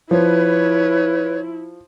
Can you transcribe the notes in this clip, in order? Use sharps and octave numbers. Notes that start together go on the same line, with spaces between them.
F3 E4 B4 C#5